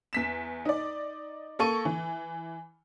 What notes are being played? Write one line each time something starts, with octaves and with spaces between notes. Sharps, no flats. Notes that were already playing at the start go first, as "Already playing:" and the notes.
E2 B6 E7
D#4 D5
A#3 A4 C#6 D#7
E3